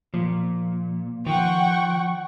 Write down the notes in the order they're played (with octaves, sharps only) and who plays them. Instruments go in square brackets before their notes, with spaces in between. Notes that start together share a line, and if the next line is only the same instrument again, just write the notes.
[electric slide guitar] A#2 [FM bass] F3
[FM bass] D#3 [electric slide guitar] F3 [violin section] F#5 G5 C#6